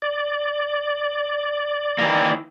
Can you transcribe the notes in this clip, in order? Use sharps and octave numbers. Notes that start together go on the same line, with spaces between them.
D5
D#3 E3 A#3